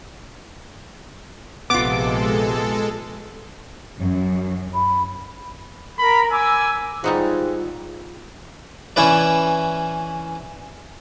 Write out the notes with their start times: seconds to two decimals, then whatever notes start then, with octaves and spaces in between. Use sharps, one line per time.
1.70 A#1 C3 G#3 B3 F4 A4 D6
4.00 F#2
4.74 B5
5.99 A#4 B5
6.31 G#5 D6 E6
7.04 G#2 G3 D#4 F4 F#4
8.96 E3 C#4 E4 B4 D5